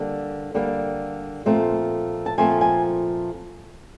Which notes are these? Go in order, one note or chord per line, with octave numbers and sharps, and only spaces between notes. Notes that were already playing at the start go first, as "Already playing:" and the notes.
Already playing: D3 G3 A#3
D3 G3 A#3
A#2 F3 A3 C4
A5
A#2 F3 A3 C4 G#5
G#5